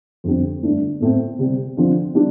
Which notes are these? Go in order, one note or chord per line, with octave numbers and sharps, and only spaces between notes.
F2 D3 G3 C4
G2 D3 A3 D4
A2 A3 C4
C3 G3 C4
D3 F3 C4
D3 G3 D4